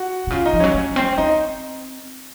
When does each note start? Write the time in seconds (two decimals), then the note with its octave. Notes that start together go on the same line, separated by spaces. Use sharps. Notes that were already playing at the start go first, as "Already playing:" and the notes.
Already playing: F#4
0.27 C3
0.30 C#3 F4
0.46 D#4
0.53 F3
0.60 F#3 C#4
0.74 G#3
0.96 C4
1.18 C4 D#4